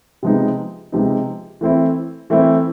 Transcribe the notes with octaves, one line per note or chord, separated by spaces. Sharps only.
C3 F3 G#3 B3 D#4
C3 F3 G#3 B3 D#4
E3 A3 C4 E4
E3 A3 C4 E4